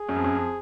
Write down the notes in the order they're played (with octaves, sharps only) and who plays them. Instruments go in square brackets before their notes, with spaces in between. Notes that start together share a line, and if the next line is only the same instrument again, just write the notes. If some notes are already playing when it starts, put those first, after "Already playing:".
Already playing: [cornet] G#4
[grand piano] F#2
F2
F#2
F2